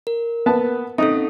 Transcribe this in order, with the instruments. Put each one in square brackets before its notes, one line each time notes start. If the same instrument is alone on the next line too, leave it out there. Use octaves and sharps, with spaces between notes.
[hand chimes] A#4
[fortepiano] B3 A5
[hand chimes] C4 C#4 A4 [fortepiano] D#4